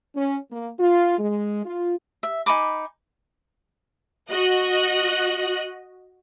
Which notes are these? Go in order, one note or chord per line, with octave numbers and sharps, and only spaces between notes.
C#4
A#3
F4
G#3
F4
E5
D#4 G#5 B5 D6
F#4 D#5 F#6